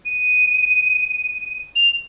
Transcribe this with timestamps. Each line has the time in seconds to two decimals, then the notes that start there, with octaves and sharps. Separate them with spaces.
0.05 D#7
1.75 F7